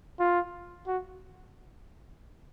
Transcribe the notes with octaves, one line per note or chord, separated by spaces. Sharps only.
F4
F#4